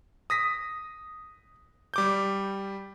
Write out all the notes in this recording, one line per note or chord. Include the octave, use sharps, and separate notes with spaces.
D#6 A#6 B6
G3 D6 G6